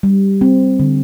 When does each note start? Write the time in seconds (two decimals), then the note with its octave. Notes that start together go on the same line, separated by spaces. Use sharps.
0.03 G3
0.41 C4
0.80 D3